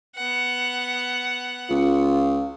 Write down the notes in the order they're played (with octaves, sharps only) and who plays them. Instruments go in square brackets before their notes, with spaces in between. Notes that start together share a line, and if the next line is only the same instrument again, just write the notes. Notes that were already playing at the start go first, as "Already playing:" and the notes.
[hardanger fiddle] B3 F#5
[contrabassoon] C#2 [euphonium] F4